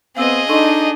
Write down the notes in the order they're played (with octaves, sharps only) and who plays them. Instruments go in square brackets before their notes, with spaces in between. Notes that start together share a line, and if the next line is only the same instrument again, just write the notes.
[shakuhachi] B3 [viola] C4 [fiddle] G#4 D#5 [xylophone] F5 E6
[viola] D4 [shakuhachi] D#4 [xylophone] A4 C6 C#6